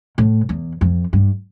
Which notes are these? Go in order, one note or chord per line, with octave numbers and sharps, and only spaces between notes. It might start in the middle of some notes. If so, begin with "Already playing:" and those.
A2
E2
F2
G2